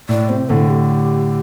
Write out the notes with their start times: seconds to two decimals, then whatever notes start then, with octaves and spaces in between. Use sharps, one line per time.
0.09 A2 D5
0.29 C3 C5
0.50 A2 D3 A4
0.70 G4